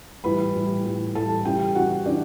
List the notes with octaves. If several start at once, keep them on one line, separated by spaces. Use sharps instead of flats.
A2 E3 G3 B4 B5
A2 E3 G3
A2 E3 G3
A2 E3 G3 A4 A5
C#3 E3 G3 G4 G5
C#3 E3 G3 F#4 F#5
C#3 E3 D4 D5